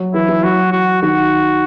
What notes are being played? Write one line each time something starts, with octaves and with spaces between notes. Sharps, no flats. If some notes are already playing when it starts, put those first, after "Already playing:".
Already playing: F#3
E3 E4
E3
F#3 F#4
F#4
D#3 F#4